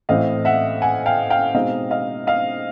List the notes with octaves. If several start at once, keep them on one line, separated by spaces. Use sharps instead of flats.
A2 E3 A3 C4 D#5 F5
E5 F#5
F#5 G#5
F5 G5
F5 G5
B2 G#3 C4 D#4 D#5 F5
D#5 F5
D#5 F5